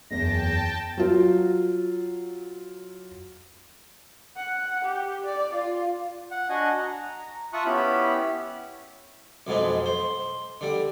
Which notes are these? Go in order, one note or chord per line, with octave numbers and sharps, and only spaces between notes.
F#1 E2 G5 A5 A#6
F#3 F4
F#5
G4
D5
F4
F#5
D4 F#4 D#5 F#5 G#5
A#5
F4 E5 A5 C#6 D#6 F#6
B3 C#4 E4 G4 B5
B1 F2 G#2 G#3 B4
C5
D3 G3